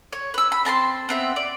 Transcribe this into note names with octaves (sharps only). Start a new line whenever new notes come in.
C#5
B4 E6
B5
C4 A5 A#5 C6
B3 C4 E5
D5